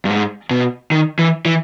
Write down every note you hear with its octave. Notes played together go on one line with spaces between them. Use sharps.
G2
G#2
B2
D#3
E3
E3